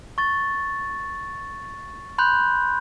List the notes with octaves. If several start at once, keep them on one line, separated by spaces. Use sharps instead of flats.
C#6 A6
B5 C6 F#6 G6